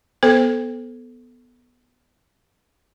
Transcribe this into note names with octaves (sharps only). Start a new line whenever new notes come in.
B3 A4 C5